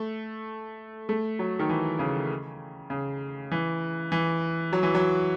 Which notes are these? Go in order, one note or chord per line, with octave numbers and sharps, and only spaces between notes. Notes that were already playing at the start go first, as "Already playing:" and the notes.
Already playing: A3
A3
F#3
D#3
E3
C#3
C#3
E3
E3
F#3
E3
F#3